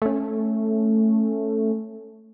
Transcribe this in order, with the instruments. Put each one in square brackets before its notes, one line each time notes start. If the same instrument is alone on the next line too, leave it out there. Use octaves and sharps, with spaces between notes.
[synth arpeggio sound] A3 C#4